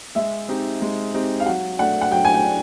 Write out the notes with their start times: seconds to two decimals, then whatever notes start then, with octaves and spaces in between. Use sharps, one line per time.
0.15 G#3 E5
0.49 C4 D#4 G4
0.82 G#3
1.14 C4 D#4 G4
1.40 F5
1.46 F#3 F#5
1.79 A3 D4 F#5
2.01 F#5
2.11 F#3 G5
2.25 G#5
2.34 G5
2.45 D4